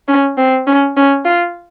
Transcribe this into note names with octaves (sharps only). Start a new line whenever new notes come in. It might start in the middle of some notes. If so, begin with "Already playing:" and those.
C#4
C4
C#4
C#4
F4